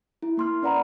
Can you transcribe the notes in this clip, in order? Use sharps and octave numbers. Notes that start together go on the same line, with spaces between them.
E4
A#3 C6 F6
C#4 B4 D5 F#5 A#5 B5